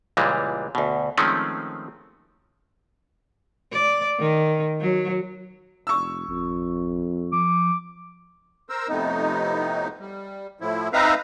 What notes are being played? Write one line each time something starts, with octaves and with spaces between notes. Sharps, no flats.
C#2 A#2 E3 G3 G#3
D2 B2
D#3 F3 G#3 A3 C4 C#4
D5
D#3
F#3
F1 C#6 E6
G#1 F2
F3 D6
A#4 C5 E6
F2 A2 C3 B3 D#4
G3
A2 F3 E4
C4 D#4 B4 E5 F5 A#5